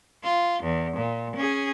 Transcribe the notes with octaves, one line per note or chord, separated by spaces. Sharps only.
F4
E2
A#2
C#4 G#4